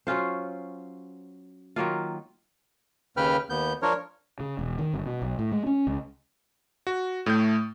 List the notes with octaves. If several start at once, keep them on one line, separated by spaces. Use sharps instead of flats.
F#3 C#4 F4 C5
D#3 F#3 A#3 F4
D#2 C#3 B4 G5 F6
D#2 B3 G6
F3 D4 A#4 C#5
C#3
E1
D#3
G1
B2
B1
A2
G#3
C#4
C#2
F#4
A2 A3 G6